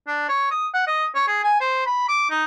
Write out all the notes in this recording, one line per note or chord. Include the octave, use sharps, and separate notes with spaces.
D4
C#5
D#6
F#5
D#5
C#5
G#4
G#5
C5
B5
D6
D#4